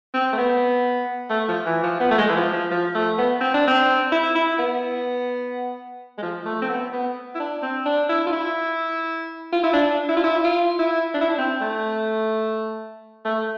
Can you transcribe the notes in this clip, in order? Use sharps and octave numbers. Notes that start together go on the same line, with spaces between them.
C4
A3
B3
A3
F3
E3
F3
B3
A3
G#3
E3
F3
F3
F3
A3
B3
C4
D4
C4
E4
E4
B3
G#3
F3
A3
C4
B3
B3
E4
D4
C4
D4
E4
F4
E4
F4
E4
D4
E4
F4
E4
F4
E4
D4
E4
D4
C4
A3
A3